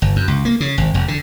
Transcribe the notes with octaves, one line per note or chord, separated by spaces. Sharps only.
G1
F#2
C#2
A#3
C#3
G#1
E1
D3